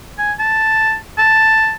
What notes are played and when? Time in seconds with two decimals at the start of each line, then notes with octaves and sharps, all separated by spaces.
0.19 G#5
0.40 A5
1.18 A5